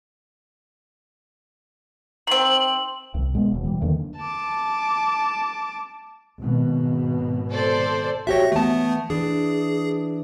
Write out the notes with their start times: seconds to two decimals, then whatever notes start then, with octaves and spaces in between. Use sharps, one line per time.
2.27 D#3 C4 F#7
3.14 C2 C3
3.34 A#2 G#3 A3 B3
3.51 D#1 B2
3.64 E3 G3
3.81 E2 D3 D#3 A#3
4.17 A5 D6
6.41 G#1 B2
7.50 A4 C5 D5
8.27 F#4 G4 C#5 E5 A#6
8.52 E3 A3 B3 A5
9.10 E3 D4 G#4